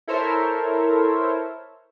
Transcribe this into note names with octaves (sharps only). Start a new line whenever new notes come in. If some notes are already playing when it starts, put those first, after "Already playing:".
E4 A4 A#4 C5 C#5 E5